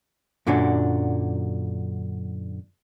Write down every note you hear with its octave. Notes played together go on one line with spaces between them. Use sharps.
F#2 A#2 D3 F#3 A#3 D4